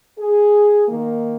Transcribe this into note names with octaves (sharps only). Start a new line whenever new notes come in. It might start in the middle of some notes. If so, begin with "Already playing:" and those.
G#4
D#3 A#3